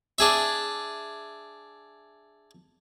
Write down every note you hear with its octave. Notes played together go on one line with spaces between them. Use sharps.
D4 G#4 E5